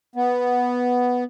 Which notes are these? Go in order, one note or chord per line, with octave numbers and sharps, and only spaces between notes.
B3